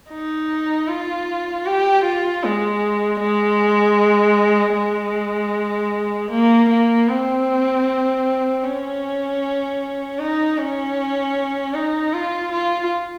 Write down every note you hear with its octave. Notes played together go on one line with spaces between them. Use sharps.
D#4
F4
G4
F4
G#3
G#3
G#3
A#3
A#3
C4
C#4
D#4
C#4
D#4
F4
F4